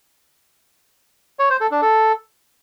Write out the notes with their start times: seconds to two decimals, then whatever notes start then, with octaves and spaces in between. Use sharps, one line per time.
1.39 C#5
1.50 C5
1.61 A4
1.71 D4
1.82 A4